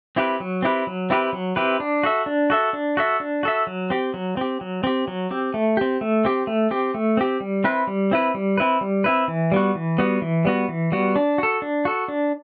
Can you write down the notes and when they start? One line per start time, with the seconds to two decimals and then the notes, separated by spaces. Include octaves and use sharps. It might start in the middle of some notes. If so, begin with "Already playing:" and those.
0.16 C4 E4 G4 B4
0.40 F#3
0.62 C4 E4 G4 B4
0.87 F#3
1.10 C4 E4 G4 B4
1.33 F#3
1.56 C4 E4 G4 B4
1.80 D4
2.03 F#4 A4 E5
2.26 D4
2.50 F#4 A4 E5
2.73 D4
2.97 F#4 A4 E5
3.20 D4
3.43 F#4 A4 E5
3.67 F#3
3.90 C4 G4
4.14 F#3
4.37 C4 G4
4.61 F#3
4.84 C4 G4
5.08 F#3
5.31 C4 G4
5.54 A3
5.77 C4 G4
6.01 A3
6.25 C4 G4
6.47 A3
6.71 C4 G4
6.94 A3
7.17 C4 G4
7.40 G3
7.64 C4 E4 B4
7.87 G3
8.11 C4 E4 B4
8.34 G3
8.57 C4 E4 B4
8.81 G3
9.04 C4 E4 B4
9.28 E3
9.52 G3 B3 F#4
9.75 E3
9.98 G3 B3 F#4
10.22 E3
10.45 G3 B3 F#4
10.69 E3
10.92 G3 B3 F#4
11.16 D4
11.38 F#4 A4
11.62 D4
11.85 F#4 A4
12.08 D4